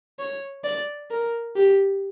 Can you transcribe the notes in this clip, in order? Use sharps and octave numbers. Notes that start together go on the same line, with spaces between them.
C#5
D5
A#4
G4